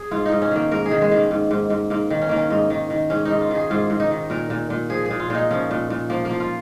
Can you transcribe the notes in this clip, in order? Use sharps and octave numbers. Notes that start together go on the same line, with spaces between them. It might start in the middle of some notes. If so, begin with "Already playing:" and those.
Already playing: G#4
G#2 F4
D#4
G#2
C#4
D#3 A#3
G#2 A#4
G#4
D#3
G#3
D#3 A#3
G#2
G#2
G#2
G#2 A#3
D#3
C#4
D#3 A#3
C#4
G#2 D#4
D#3
D#3
G#2 C#4
D#4
G#2
F4
D#3 G#4
G#2 F4
G#2
D#4
D#3
A#2 A#4
A#2
A#2
F3 G#4
A#2 G#4
F4
A#2 D#4
F3 C#4
A#2
A#2
F3 A#3
A#3
F3
F4